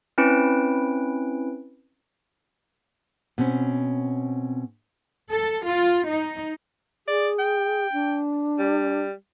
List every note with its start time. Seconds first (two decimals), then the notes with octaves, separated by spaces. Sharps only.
0.18 C4 C#4 E4 B4 D7
3.38 B2 C4 C#4
5.31 A4
5.65 F4
6.07 D#4
7.07 G#4 D5
7.39 G5
7.93 D4
8.59 G3